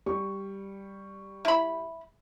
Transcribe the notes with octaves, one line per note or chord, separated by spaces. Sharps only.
G3 C#6
E4 B5